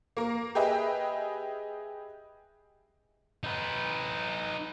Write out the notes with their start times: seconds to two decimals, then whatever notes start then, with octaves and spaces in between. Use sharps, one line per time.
0.17 A#3 A#4
0.55 G4 G#4 B4 D#5 E5 G5
3.44 D#4 B4